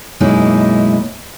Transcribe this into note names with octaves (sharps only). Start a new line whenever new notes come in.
F#2 B2 G#3 A#3 D#4 E4